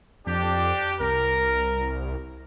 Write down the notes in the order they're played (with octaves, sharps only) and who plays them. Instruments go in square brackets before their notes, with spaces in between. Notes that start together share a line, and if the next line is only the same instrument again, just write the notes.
[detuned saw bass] F2 [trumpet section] D4 G4
[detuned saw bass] C2 [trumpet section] A#4